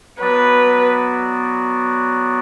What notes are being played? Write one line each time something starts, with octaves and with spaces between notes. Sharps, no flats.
F#3 B3 F#4 B4 D5